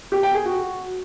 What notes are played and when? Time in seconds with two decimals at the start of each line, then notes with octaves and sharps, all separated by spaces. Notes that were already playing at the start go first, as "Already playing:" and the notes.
0.12 G4
0.23 G5
0.34 G#4
0.46 F#4